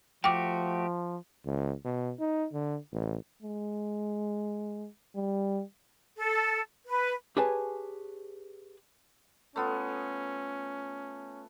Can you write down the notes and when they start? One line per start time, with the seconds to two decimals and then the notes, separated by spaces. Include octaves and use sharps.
0.24 F3 A3 F#4 G4 G5 D6
1.46 C#2
1.85 B2
2.20 D#4
2.53 D3
2.92 A1
3.42 G#3
5.15 G3
6.17 A4
6.86 B4
7.37 G4 G#4 B4 C#5 G#5 A5
9.56 A3 B3 C#4 F4